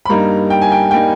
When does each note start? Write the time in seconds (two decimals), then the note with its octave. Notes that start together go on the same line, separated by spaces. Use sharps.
0.05 B5
0.09 G2 G3 A#3 D#4 A#5
0.50 G5
0.62 G#5
0.72 G5
0.91 G3 A#3 D#4 G5